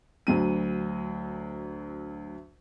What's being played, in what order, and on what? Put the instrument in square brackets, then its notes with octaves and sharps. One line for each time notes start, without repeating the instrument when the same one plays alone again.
[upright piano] D2 F#3 D#7